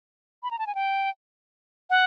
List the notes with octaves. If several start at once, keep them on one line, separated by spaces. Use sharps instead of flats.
B5
A#5
A5
G#5
G5
F#5